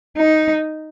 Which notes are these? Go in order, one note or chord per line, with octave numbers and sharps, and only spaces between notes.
D#4